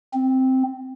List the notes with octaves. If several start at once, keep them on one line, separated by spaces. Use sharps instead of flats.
C4